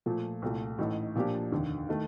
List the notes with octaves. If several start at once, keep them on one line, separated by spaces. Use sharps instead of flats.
A#2 F3 A3
C2 A#2 A3
A1 A2 A3 D#4 A4
A#2 F3 A#3 D4 G4
F1 D#2 D3
D#3 A3